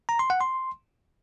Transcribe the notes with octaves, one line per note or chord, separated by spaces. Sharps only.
A#5
C6
F#5
C6